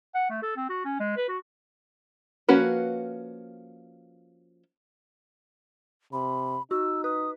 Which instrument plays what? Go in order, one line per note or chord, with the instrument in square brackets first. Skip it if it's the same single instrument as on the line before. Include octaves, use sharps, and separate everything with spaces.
[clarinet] F#5
A3
A4
C4
F#4
C#4
G#3
B4
F#4
[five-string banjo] F3 A#3 C#4 F#4 B4
[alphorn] C3 [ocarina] B5
[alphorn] D#4 [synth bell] F#4 [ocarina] E6
[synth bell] B4 [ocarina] D#6